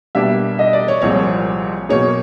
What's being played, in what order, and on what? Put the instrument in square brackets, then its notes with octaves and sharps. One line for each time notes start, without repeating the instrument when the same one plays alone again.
[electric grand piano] B2 G3 A#3 D4 G4 [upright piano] E5
[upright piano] D#5
D5
C#5
[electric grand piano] C2 A#2 F3 G#3 C4 [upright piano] C#5
[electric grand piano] B2 F#3 A#3 D#4 G#4 [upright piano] C#5